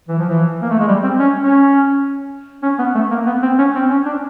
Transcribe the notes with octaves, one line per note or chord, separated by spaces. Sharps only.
E3
F3
E3
A#3
A3
G#3
G3
C4
C#4
C#4
C#4
B3
A3
A#3
B3
C4
C#4
C4
C#4
D4